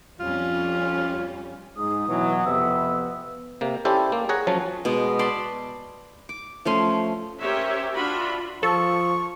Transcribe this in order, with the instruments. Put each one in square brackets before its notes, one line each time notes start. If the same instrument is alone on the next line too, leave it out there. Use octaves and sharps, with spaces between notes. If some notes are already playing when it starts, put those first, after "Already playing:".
[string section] F2 G3 C#4 [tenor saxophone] F4
[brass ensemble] G#2 [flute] D#6
[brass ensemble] B2 F#3 [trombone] E3
[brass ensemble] F2 C3 [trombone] B3 [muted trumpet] E5
[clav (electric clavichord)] C3 A#3
C#4 E4 G4 A4 C5 D5
A#3
G#4 C#5 F#5 A#5
F3 F#3 C#4 A5
[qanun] B2 G#3
D5 A5 B5 C6
D6
F3 A3 C#4 C6
[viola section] C#4 G4 A#4 C5 C#5 E5
D4 F4 F#4 E5 B5
[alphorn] F3 [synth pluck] A4 [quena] C#6